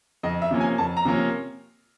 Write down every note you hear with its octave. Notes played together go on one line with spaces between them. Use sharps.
F2 D#5
E5
C3 F3 A#3 C#4
G#5
F2 A5
A#5
C3 F3 A#3 C#4